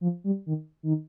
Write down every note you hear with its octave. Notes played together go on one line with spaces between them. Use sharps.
F3
G3
D#3
D#3